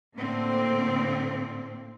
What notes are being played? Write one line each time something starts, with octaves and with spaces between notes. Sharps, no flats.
A2 D3 A#3 C4